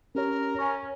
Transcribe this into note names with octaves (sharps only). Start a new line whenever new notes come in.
C#4 G4 A#4 C#5
C#4 C#6